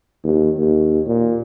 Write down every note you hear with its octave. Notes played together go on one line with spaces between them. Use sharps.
D#2
D#2
A#2